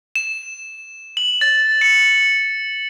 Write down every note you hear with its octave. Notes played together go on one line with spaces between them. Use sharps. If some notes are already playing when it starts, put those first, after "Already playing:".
E7
F#7
A6
C#7